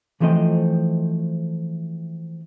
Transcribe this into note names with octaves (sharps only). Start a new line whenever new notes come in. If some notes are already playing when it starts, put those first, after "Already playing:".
E3 F3 A3 C4 D#5